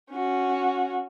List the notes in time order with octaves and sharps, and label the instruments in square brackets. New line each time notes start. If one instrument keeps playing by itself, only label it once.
[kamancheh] C#4 F#4